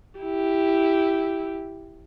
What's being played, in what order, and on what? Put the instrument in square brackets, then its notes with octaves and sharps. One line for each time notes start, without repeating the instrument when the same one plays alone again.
[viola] E4 G4